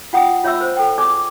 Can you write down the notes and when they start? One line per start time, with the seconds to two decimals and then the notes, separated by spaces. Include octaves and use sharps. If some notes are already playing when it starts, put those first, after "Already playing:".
0.13 F4 F#5 G5 D#6
0.43 F4 C#5 E5 B5 E6
0.61 C5
0.77 A4 G5
0.98 G#4 D5 G#5 D6